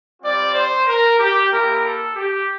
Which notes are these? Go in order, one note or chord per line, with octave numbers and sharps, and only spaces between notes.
G3 C4 F4 D5
C5
A#4
G4
A#3 E4 G4 A#4
A4
G4